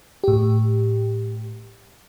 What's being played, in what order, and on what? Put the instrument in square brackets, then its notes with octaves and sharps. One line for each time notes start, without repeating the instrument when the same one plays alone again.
[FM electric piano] A2 G4